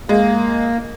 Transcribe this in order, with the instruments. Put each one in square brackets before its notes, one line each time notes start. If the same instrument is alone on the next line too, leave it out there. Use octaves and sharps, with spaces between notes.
[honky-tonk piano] G#3 [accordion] A#3